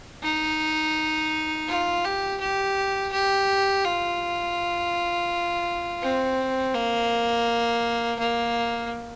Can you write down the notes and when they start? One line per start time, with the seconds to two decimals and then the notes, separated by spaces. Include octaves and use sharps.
0.23 D#4
1.68 F4
2.04 G4
2.40 G4
3.12 G4
3.85 F4
6.03 C4
6.74 A#3
8.19 A#3